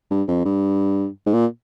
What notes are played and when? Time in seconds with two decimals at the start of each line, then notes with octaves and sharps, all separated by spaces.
0.10 G2
0.28 F2
0.45 G2
1.26 G#2
1.33 A#2